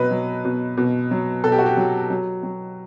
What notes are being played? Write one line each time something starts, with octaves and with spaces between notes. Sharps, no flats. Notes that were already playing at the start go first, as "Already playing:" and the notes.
Already playing: B2 F#3 B4 D#5
F#3
B2
B2
F#3
B2 A4
G4
F#4
G4
F#3
F#3
F#3